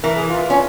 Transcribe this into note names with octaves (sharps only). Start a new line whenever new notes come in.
E3 A#4
G#4
F4
F4
C#4